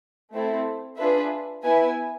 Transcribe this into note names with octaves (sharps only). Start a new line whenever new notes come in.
A3 C4 E4 A4
D4 F4 G#4 B4 E5
B3 E4 B4 E5 G#5